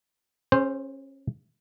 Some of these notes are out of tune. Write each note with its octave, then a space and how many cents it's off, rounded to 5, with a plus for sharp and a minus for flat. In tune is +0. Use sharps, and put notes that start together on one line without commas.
C#4 -30 G#4 +0 C5 +0